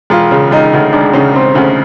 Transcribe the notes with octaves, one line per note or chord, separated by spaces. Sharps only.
E1 F4
C#3
E1 D#4
D2
E1 D4
C#3 C#4
E1 C4
D2 C#4